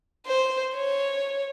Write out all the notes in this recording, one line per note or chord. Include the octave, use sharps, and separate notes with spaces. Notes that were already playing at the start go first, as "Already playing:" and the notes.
C5
C#5